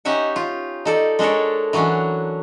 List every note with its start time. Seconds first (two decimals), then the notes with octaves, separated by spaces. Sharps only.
0.05 C#4 D#4 G4 E5 F#5
0.36 F4
0.85 D#4 A4 D5
1.19 G#3 D4 A4 A#4 C#5
1.73 E3 F#3 C#4 D4 F#4